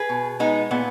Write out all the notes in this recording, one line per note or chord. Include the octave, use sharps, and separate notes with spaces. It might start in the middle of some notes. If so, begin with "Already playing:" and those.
Already playing: G#4 B4
B2
G#3 B3 D#4
A#2 B3